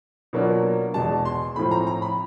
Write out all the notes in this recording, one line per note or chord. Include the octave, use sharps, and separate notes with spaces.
B2 F#3 A#3 D4 F4
E2 B2 G#3 A5
C6
A2 F3 A3 C4 B5
A#5
A#5
B5